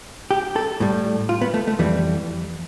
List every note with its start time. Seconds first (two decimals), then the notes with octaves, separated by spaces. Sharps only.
0.31 G4
0.56 A4
0.80 A2 G3
1.29 F4
1.41 B3
1.54 A3
1.67 A3
1.79 F2 E3 G3 B3